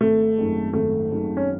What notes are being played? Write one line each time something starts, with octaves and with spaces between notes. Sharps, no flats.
G#1 A3
F#2 D#3 G#3
G#1 A3
F#2 D#3 G#3
C#4